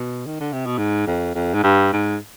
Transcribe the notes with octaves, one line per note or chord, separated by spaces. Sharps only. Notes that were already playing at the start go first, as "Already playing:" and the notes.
Already playing: B2
D#3
D3
C3
B2
G#2
F2
F2
G#2
G2
G#2